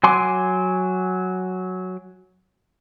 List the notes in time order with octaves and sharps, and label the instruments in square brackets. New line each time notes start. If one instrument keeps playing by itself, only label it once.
[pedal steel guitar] F#3 G#5 C6 D6